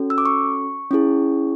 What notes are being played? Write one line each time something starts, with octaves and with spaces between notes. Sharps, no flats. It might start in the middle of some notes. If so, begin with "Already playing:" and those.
Already playing: C#4 F#4 A4
E6
D6
C#6
C#4 E4 G#4